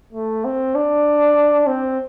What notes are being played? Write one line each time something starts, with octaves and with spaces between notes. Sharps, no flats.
A3
C4
D4
C4